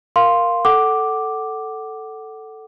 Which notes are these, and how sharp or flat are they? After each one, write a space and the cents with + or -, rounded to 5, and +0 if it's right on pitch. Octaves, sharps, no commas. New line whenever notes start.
A#4 +0 F5 +0 C6 +0
A4 +0 F#5 +20 D6 +0